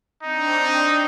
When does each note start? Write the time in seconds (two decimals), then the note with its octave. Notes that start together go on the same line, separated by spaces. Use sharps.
0.23 C4 D4 D#4
0.76 C4 D4